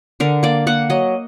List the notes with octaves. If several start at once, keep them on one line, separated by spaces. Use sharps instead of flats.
D3 A#4
A#3 D5
A#3 F#5
F#3 D#5